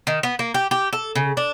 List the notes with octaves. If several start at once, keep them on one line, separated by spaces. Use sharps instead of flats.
D#3
B3
A#3
G4
G4
A4
C#3
D4